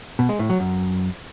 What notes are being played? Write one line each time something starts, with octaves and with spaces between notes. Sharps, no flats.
B2
G#3
A2
F#3
F#2